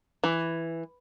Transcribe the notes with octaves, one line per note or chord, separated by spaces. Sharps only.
E3